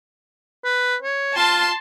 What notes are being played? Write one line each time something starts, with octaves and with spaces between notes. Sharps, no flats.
B4
C#5
F4 A5 C6